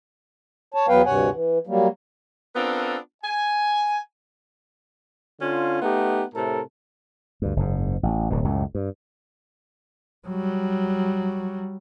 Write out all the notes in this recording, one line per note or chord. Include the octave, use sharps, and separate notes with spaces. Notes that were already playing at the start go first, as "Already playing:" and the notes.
C#5 A5
E2 F#3 B3 B4 F5 G5
D2 G2 C3 C#5 F#5 G#5
E3
F#3 G3 A#3
B3 C4 D4 F4 A4 A#4
G#5
D3 C#4 F4
A3 B3 D#4 G4
A2 C3 A4 A#4
D2 G2
F#1 G#2
A1
D1 D2 B2
C#2 F#2 A2
G2
F#3 G3